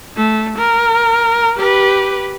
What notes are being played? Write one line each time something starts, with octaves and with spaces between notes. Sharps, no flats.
A3
A#4
G4 B4